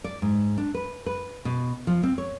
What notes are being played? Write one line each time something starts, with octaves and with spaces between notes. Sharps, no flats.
D5
G#2
D4
B4
B4
B2
F3
C4
C#5